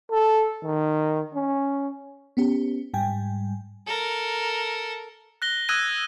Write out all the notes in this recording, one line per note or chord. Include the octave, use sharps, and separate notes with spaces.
A4
D#3
C#4
B3 C#4 G4
G#2 G3 G5 G#5
A4 A#4
F#6 A#6 G7
D#6 E6 F#6 G#6 A#6 D#7